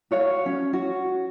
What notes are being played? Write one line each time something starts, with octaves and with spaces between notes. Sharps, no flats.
F#4 C#5 F5
C#4
F#4